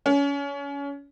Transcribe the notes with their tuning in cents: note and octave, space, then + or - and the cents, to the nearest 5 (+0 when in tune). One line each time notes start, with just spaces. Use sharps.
C#4 +25